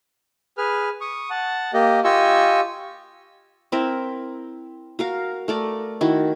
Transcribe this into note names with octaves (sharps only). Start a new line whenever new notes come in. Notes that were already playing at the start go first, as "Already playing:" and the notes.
G#4 B4 F6
C#6 D#6
F#5 A5
A#3 G4 D#5
F4 G4 D#5 G#5 C#6 E6
C4 E4 A#4 E5
F#4 A#4 F5
A3 A#4 D5
D#3 E4 F#4